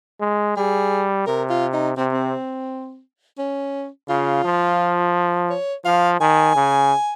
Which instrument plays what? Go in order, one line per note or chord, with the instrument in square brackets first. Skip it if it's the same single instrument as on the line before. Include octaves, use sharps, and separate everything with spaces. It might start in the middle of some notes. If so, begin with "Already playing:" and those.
[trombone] G#3
[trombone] G3 [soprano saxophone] G#4
[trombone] C3 [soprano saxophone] A#4
[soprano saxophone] F4
D#4
[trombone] C3 [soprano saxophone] C4
[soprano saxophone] C4
C#4
[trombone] C#3 [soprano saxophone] F4
[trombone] F3
[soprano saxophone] C#5
[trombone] F3 [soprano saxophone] F5
[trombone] D#3 [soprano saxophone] G#5
[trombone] C#3